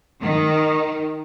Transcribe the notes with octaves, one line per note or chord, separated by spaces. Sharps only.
D#3